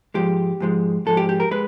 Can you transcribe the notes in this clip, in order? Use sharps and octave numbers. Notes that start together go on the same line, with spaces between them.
G#2 F3 G#3 G4
G#2 F3 G#3
G#2 F3 G#3 A4
G4
G4
A#4
G#3 B4